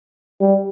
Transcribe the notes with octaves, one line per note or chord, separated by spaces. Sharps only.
G3